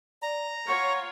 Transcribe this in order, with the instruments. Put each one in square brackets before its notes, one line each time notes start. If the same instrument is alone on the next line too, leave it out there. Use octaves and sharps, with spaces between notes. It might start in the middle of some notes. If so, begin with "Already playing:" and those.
[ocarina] D5 [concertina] A#5
[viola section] F4 C#5 [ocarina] F#5 [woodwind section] C#6